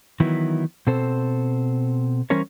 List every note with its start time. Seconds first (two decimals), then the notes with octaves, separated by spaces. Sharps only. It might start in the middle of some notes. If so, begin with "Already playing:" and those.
0.20 D#3 E3 F#3 B3 E4
0.87 B2 C4 A4 C5
2.30 E3 G3 C#4 A#4 C5 C#5